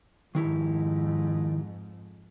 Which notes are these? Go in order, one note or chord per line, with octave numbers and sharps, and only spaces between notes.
F2 G#2 D#3 E4 G4